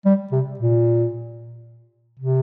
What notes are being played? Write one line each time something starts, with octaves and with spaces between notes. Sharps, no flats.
G3
C3
A#2
C3